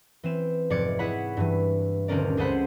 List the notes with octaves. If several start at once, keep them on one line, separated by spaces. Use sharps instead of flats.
E3 C4 E7
F1 G#2 D5 D6 G#6 C#7
E4 G#4 C#5 F#5 B5
G2 E3
D#1 D3 C4 C#4 A#4 D5
C#2 G#4 A4 C5 F#5 B5